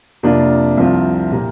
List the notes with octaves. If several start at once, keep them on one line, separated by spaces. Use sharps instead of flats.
F2 C3 A#3 D4 F4
C2 C3 F3 C4 F4
A#2 A#3 G4 A#4